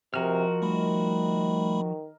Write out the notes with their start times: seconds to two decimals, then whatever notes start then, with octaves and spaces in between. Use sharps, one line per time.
0.14 C3 F3 F#4 A#4 D#5 G#5 F6
0.62 D#3 G3 A3 B5